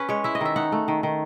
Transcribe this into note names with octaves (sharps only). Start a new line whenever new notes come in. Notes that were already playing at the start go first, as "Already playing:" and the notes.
Already playing: C#4 B4
G#3 C#5
E4 E5
D#5
D#3 E5
D#4 F#5
A3
D#3
D#3